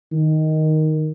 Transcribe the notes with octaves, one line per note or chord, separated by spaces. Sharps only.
D#3